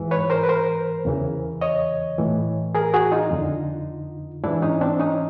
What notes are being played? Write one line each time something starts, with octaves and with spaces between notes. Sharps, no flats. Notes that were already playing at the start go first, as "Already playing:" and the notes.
Already playing: G#2 E3
B4 C#5
A#4 C5
B4
A#4 C5
E2 C#3 E3
C#5 D#5
A2 E3
G#4 A#4
F#4 G#4
D#4 F4
F2 D3
G#2 E3 D4 E4
C#4 D#4
C4 D4
C#4 D#4